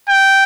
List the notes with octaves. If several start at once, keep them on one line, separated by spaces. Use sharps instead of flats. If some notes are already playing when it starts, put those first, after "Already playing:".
G5